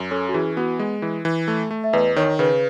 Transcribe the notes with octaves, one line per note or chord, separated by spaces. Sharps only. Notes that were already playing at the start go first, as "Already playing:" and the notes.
Already playing: F#2
C#4 A4
F#4
E3 G#4
B3 F#4
G#3
E3
E3
A3
A3
E5
E2 B4 D#5
D#3 C#5
C#3 B4